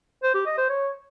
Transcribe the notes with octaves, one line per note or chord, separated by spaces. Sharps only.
C5
G4
D#5
C5
C#5